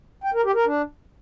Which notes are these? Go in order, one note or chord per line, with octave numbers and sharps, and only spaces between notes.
G5
A#4
G4
A#4
D4